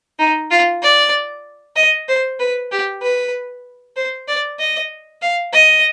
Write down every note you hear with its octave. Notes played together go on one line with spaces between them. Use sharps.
D#4
F4
D5
D#5
C5
B4
G4
B4
C5
D5
D#5
F5
D#5